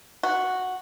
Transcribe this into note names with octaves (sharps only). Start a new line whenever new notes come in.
F#4